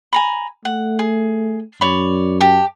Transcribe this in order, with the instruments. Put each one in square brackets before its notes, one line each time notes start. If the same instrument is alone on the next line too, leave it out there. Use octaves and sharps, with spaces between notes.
[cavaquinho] G#5 A#5 B5
[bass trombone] A3 [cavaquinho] F#5
[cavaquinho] G#4
[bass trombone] F#2 [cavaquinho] C#5 D5 B5
[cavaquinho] G4 A5